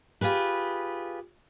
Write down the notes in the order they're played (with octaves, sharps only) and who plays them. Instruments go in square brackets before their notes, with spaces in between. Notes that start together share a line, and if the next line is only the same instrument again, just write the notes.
[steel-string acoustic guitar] F4 G4 G#4 B4